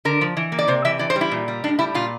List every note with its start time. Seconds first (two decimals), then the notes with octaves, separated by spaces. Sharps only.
0.05 D3 A#4
0.21 F3
0.37 E3
0.52 A#3
0.59 D5
0.68 C3 C5
0.85 E3 E5
0.99 E3 D5
1.10 C5
1.16 G3
1.21 E4
1.31 A#2
1.48 G3
1.64 A2 D4
1.79 G3 E4
1.94 A#2 F4